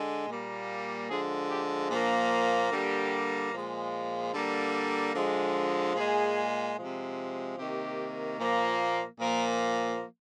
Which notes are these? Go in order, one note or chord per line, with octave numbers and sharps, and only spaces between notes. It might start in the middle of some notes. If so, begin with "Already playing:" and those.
Already playing: D3 G#3
A#2 G3 A#3
D3 F3 G#3 G#4
G4
A#2 F3 A#3 D4
D3 G3 A#3 G4
A#2 F3 G#3
D3 G3 A#3
D3 F3 G#3
A#2 G#3 G#4
C3 F3 G#3
C3 D#3 A#3 G4
A#2 F3 A#3
A#2 F3 A#3 A#4